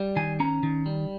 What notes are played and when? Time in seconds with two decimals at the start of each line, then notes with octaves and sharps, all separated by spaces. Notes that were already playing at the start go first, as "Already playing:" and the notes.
Already playing: G3
0.16 D#3 G#5
0.40 C#4 A#5
0.63 D#3
0.86 G3